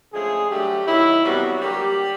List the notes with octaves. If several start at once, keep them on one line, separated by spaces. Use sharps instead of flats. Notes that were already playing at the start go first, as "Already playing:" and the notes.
D3 F3 G#3 A3 C#4 G#4
D3 F#3 G3 A3 G4
F#2 D#3 F#3 E4
C3 E3 F#3 G3 B3 F#4
D3 F#3 G3 A#3 G4